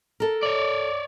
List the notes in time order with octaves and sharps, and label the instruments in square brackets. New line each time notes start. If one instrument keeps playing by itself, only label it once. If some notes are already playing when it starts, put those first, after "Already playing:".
[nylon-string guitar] A4 A#4
[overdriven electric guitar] C#5 D5